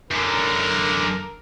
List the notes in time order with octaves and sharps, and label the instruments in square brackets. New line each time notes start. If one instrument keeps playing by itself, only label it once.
[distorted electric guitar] F#2 D3 [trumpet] A#4